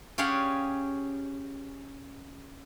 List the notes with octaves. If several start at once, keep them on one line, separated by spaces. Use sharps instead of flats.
C#4 G4 G#4 D5 F5 F#5